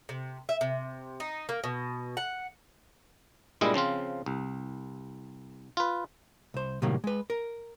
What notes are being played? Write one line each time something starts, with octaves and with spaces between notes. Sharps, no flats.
C3
E5
C3
D#4
A#3
B2
F#5
G2 A#2 G3 G#3 E4 D#5
C#3 F3 C4 F4
C2
F4 B4
C2 C5
A2 C3 D#3 F#3 G3 A#3
G#3 B4
A#4